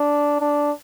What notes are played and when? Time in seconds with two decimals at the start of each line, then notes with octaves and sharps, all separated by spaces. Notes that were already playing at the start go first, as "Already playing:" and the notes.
Already playing: D4
0.41 D4